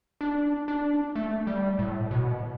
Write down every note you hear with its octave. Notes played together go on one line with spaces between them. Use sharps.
D4
D4
A3
G3
A2
B2